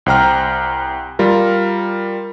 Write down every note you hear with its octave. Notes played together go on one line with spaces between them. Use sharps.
C2 C5 G5 A#5 F6
G3 F4 A#4